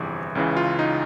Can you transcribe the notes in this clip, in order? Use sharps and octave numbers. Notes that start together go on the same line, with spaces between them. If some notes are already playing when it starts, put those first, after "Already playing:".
Already playing: G1 F2 C3 E3 G#4
C#2 C#3 E3
F4
D#4